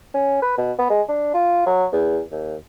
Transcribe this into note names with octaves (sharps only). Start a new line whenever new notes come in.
C#4
B4
B2
B3
G#3
D4
F4
F#3
E2
D#2